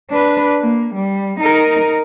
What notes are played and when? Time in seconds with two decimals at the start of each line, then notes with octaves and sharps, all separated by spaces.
0.10 D4 B4
0.61 A#3
0.95 G3
1.40 D#4 A#4